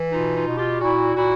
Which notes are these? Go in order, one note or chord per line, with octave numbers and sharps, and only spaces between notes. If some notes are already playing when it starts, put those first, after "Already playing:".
Already playing: E3
B2 D#4 F4
D#4 F4
B2
F4 G4
A#2 E4 F#4
A#2 E4 F#4